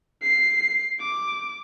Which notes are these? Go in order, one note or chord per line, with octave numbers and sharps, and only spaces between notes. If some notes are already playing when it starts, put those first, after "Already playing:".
C7
D6